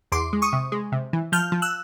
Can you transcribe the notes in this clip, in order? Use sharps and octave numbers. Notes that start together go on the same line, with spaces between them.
E2 C6 D6
G#3
C#6 D#6
C3
G#3
C3
E3
F3 F6 G6
F3
E6 F#6